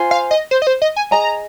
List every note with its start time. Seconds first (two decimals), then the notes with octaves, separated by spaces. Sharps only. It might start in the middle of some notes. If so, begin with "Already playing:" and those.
Already playing: F4 C5 G#5
0.11 F5
0.31 D#5
0.51 C5
0.62 D#5
0.67 C5
0.82 D#5
0.96 G#5
1.11 G#4 D#5 G#5 A#5